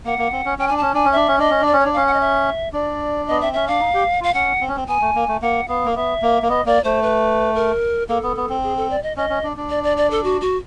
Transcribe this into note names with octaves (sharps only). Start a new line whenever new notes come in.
A#3 F#5
A#3
C4
C#4
C#4 G5
D4 G#5
C#4 A5
D4 G#5
C#4
D4 E5
C#4
D4 D#5
C#4
D4
D5
C#4
C#5
D4
C#4 F5
F#5
D#5
E5
D4 D5
B3 D#5
C4 E5
C#4 E5
D4 F5
D#4
G4
F4 F5
C#4 F#5
C4
C#4
C4
B3 G#5
A3
A#3
A3
A#3 F#5
B3 F5
A#3
B3 E5
A#3
A#3
B3 D#5
A#3 D5
A3 C5
B4
A#4
A#3 A4
B3
B3
C4
G#4
A4
D5
D#5
C#4 D#5
C#4
D4
D4
D5
D5
D5
A4
F#4
F#4